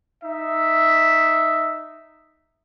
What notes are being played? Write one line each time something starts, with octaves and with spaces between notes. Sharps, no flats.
D#4 E5